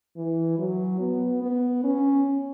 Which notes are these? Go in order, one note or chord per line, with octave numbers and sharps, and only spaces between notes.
E3
F#3
B3
B3
C#4